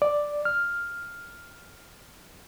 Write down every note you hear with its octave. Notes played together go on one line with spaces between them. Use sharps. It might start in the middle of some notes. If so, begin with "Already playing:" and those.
D5
F6